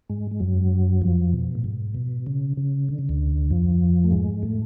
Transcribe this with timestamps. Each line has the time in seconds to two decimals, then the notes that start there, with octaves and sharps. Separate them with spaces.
0.09 G#2 G#3
0.31 G#3
0.40 F#2 F#3
1.02 F2 F3
1.33 B2
1.55 A2
1.64 G#2
1.94 B2
2.27 C#3
2.57 C#3
2.89 D3
2.99 C#3
3.09 D2 D3
3.50 F2 F3
4.04 A3
4.11 G#2 G#3
4.43 A2 A3